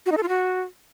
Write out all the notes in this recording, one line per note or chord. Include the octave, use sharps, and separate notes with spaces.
F#4
D#4
A4
F4
F#4